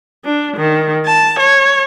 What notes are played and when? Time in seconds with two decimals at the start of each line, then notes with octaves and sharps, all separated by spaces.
0.25 D4
0.57 D#3
1.06 A5
1.40 C#5